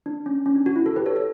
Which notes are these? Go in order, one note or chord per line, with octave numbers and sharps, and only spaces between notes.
D4
C#4
C#4
D4
F#4
E4
F#4 A4
G4 B4
A4 C#5
A4 C#5